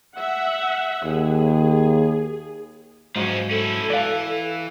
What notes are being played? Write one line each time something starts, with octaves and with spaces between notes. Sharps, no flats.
E5 F#5
D#2 G#4
G#2 F3 F#3 C#4
C#4 E4 A4
E3 D5 F5